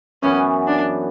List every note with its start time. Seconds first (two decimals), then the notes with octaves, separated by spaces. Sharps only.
0.23 F#2 E3 B3 C#4 F#4
0.67 D4